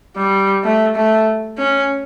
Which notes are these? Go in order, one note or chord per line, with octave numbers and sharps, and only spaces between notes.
G3
A3
A3
C#4